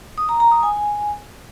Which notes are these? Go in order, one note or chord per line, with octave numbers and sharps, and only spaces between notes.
D#6
A#5
A#5
D#6
G#5